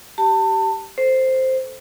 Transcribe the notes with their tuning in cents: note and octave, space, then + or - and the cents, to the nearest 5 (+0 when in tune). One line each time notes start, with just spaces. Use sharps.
G4 -15 A5 +30
A4 +0 C5 +0